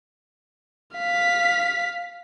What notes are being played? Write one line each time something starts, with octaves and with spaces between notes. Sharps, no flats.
F5 B6